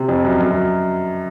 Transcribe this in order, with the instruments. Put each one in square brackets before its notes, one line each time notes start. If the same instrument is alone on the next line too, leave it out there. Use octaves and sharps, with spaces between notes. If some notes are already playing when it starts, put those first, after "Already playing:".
Already playing: [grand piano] C3
F2
F#2
F#2
F#2